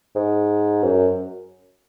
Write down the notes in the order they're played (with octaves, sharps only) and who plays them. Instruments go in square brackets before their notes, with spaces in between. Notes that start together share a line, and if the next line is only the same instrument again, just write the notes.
[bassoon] G#2
F#2